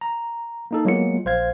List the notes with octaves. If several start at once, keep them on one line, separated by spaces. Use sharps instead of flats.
A#5
A#3 D#4 A4
F#3 G#3 A#3 B3 F4 C#7
A#1 C5 F5 G#6